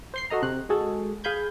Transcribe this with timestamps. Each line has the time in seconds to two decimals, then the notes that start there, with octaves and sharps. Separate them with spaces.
0.14 C5 C6 C7
0.30 F#4 A4 D#5 A#5
0.42 C3 F#6
0.69 G#3 F#4 G#4 A4
1.24 G#4 F5 G#5 B5 G6 G#6